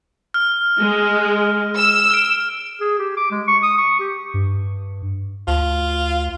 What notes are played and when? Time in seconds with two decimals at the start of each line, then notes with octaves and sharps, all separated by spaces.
0.34 F6
0.82 G#3
1.77 E6
2.11 F6 D7
2.81 G#4
2.99 G4
3.17 D6
3.31 G#3
3.48 C#6
3.63 D#6
3.78 C#6
4.00 G4
4.34 G2
5.47 D2 F4